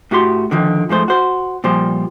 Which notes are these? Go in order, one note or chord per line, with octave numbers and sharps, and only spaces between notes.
A2 F#4 G4 C6
D3 D#3 F3
G#2 F3 A3 C5
F#4 C5
A#2 F3 G3 C5